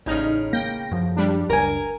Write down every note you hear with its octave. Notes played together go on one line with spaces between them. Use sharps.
A1 A2 C#3 D#4 F6
A#3 G5 A#6
F#2 F3
G3 D4
F#1 C#2 A#4 G#5